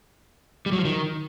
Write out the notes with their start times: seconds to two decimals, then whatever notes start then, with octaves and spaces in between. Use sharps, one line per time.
0.66 G3
0.72 F#3
0.79 F3
0.85 D#3